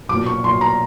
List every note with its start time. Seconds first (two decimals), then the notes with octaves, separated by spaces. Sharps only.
0.09 B1 D6
0.14 A#2
0.26 C#6
0.44 B1 A#2 C6
0.61 A#5